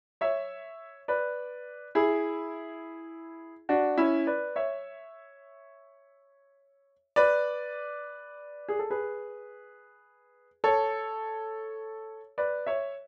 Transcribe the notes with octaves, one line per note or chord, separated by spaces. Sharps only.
C#5 E5
B4 D5
E4 G#4
D4 F#4
C#4 E4
B4 D5
C#5 E5
B4 D5
G#4
A4
G#4 B4
A4 C#5
B4 D5
C#5 E5